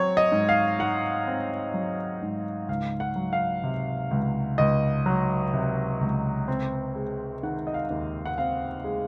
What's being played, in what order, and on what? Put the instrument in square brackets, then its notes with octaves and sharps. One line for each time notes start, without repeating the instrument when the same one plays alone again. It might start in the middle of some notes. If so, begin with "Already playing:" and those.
Already playing: [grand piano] F#3 C4 C#5
D#5
G#2
F5
D#4 F#5
C4
F#3
G#2
C#2 F5
F#5
F#3
F5
C3
C#2
C#2 D#5
F#3
C3
C#2
C4
G#3
D#3 F#5
D#5
F5
D#2
F#5
C4 F5
G#3